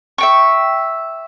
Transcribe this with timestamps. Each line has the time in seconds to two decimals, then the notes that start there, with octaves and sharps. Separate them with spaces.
0.18 E5 G5 C#6